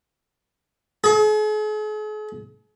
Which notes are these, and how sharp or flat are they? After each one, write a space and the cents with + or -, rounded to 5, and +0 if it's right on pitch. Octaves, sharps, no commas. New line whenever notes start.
G#4 +45